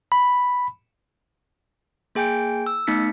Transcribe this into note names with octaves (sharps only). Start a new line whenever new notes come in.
B5
A#3 G#4 G5 G#5 G6 D7
E6
A3 B3 D#4 B6 C#7